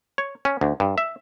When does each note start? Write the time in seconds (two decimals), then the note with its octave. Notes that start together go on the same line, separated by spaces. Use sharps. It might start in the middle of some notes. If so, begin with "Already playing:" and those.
0.18 C#5
0.45 C#4
0.61 D2
0.80 G2
0.98 E5